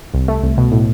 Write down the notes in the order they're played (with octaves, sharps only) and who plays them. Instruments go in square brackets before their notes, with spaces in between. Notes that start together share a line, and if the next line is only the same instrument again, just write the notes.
[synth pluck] C2
A3
C2
B2
A2